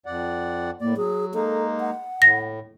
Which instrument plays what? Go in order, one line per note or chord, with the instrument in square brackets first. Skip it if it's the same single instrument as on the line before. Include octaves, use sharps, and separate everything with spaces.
[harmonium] F2 D5 F#5
[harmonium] A2 D5 [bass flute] A#3
[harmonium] F#3 [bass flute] G#4
[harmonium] G#3 A#3 D#4 [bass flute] A4
[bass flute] F#5
[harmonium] A2 [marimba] A#6